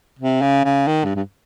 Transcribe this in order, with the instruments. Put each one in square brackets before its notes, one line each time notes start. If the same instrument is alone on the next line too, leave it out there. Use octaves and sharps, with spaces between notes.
[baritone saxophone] C3
C#3
C#3
D#3
G2
G2